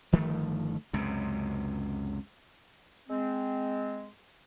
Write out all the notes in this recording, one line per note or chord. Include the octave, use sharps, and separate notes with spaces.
G1 D#3 F3 A3
C#2 F#2 C3
G#3 C4